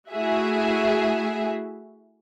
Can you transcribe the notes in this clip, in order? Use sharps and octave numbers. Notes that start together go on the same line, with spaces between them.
A3 E4 F#4 G#4 E5